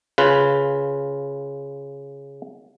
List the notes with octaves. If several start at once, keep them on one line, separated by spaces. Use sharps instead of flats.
C#3 F4 B4